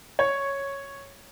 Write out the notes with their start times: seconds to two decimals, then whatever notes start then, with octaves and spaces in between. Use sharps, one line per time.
0.19 C#5